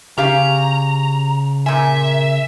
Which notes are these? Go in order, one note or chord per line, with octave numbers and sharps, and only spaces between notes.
C#3 C#4 G4 F5 A#5
A#2 E5 G#5